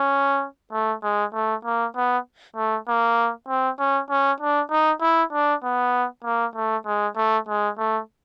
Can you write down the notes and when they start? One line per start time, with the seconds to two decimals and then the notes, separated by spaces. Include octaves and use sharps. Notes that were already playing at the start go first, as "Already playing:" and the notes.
Already playing: C#4
0.73 A3
1.03 G#3
1.34 A3
1.65 A#3
1.96 B3
2.56 A3
2.88 A#3
3.48 C4
3.79 C#4
4.10 C#4
4.40 D4
4.71 D#4
5.02 E4
5.33 D4
5.63 B3
6.24 A#3
6.55 A3
6.86 G#3
7.16 A3
7.48 G#3
7.78 A3